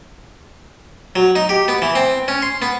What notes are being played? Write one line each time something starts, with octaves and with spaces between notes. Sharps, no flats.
F#3
D#4
G4
B3
E3
C4
C#4
C6
B3